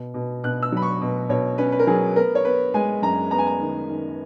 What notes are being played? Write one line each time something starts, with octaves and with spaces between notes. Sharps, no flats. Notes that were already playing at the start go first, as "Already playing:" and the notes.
Already playing: B2
B2
B2 F#6
E6
F#3 B5
C#6
B2
B2 C#5
C#4 B4
B4
A#4
F#3 G#4
B3 A#4
C#5
B3 B4
G#3 G#5
F#2 A#5
B3 A#5
G#5
A#5
D#3
D#3